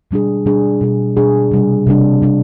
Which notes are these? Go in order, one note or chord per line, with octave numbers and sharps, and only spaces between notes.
B2 G3 D4 G#4
B2 G3 D4 G#4
B2 G3 D4 G#4
B2 G3 D4 G#4
C3 G3 D4
C3 G3 D4
C3 G3 D4